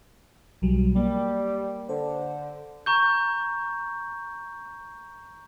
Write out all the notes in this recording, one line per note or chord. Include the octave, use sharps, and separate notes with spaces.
B1 F#3 G3
G3 A#3
D3 C5
A#5 C#6 G6